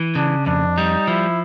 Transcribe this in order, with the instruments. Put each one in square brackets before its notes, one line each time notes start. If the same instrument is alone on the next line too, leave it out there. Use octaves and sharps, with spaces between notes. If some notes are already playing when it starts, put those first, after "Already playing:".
Already playing: [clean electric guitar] E3
[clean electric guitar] C#3 [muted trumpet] D4
[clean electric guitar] F2 [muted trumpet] D4
[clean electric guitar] G3 [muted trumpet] D#4
[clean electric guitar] F3 [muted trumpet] E4